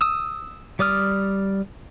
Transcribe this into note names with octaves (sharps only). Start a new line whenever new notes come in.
D#6 E6
G3 D5 D#6 F6